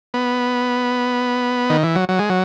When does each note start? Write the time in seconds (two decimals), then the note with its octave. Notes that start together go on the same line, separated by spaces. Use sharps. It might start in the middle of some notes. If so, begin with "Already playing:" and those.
0.14 B3
1.70 D#3
1.83 E3
1.95 F#3
2.09 F#3
2.19 G#3
2.30 F#3